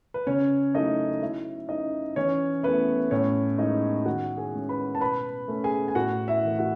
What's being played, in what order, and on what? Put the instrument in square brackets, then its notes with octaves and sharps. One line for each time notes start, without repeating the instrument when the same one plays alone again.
[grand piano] B4
C#3 C#4 C#5
F#3 A3 C#4 D#4 E4 D#5
F#3 E4 E5
C#4 D#4 E4 D#5
E3 C#4 C#5
A3 B3 C#4 E4 B4
A2 C#4 C#5
G#3 B3 D#4 E4 D#5
D#3 F#4 F#5
G#4 G#5
G#3 C#4
B4 B5
A5
B2 B4 B5
A3 C#4
G#4 G#5
G#5
A2 F#4 F#5
E4 E5
E3 A3
F#4 F#5